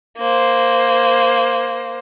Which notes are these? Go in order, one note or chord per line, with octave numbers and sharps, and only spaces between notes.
A#3 C5